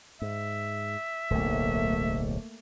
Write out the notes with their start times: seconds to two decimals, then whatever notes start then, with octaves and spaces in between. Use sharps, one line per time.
0.22 G#2 E5
1.30 D1 B1 A3 A#3